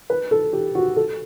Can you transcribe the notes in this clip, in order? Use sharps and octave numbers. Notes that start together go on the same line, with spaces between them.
B4
A4
G4
F#4
A4